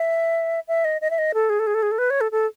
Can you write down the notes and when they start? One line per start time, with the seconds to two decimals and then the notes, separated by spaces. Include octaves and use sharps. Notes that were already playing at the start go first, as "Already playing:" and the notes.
Already playing: E5
0.68 E5
0.85 D#5
1.01 D#5
1.10 E5
1.18 D#5
1.34 A4
1.50 G#4
1.59 A4
1.67 G#4
1.74 A4
1.82 G#4
1.91 A4
1.98 B4
2.10 C#5
2.21 A4
2.32 A4